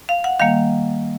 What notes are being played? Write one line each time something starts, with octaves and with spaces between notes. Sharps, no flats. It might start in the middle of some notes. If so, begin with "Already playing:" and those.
F5
F#5
D#3 G3 A#3 F5